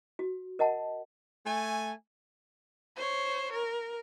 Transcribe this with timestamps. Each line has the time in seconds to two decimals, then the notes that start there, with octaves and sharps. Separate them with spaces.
0.19 F#4
0.59 A#4 D#5 F#5 A5
1.46 A3 G#5
2.96 C5 C#5
3.52 A#4